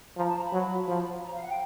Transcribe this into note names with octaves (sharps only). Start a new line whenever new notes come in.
F3 A#5
A5
A#5
B5
F#3
F3
A#5
F5
F#5
G5